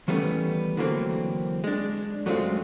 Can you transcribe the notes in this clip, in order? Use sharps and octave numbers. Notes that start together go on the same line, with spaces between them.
D#3 E3 G3 A3 B3 C#4
D3 E3 F#3 A#3 C4
G#3 D4
F#2 F#3 G#3 A3 C4 F4